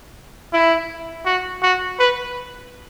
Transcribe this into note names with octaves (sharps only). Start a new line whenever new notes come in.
E4
F#4
F#4
B4